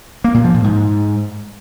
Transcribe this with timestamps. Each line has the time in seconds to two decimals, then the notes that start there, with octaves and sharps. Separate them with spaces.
0.24 A#3
0.34 A#2
0.44 F3
0.54 A#2
0.64 G#2